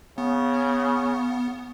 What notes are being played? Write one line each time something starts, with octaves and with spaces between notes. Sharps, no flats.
C#3 B3